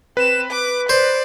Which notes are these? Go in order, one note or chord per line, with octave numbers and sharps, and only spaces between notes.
C4 B4 E7
D6
C5 D5